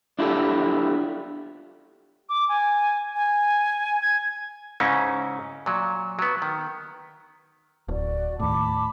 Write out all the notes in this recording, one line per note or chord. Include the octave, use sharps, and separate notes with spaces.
D4 E4 F4 G4 A4
D6
G#5
G#5
G#6
G#2 C#3 C#4 D#4 E4
A#2 F#3
F#3 B3
D#3
D1 F#4 D5
D#2 A2 A5 B5 D6